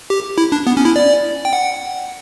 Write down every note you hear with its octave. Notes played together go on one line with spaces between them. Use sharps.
G4
E4
D4
B3
C#4
E4
D5
G5
F#5